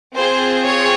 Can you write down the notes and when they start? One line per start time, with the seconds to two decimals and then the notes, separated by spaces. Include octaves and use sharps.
0.15 C4 F4 G#4 C5
0.66 C#5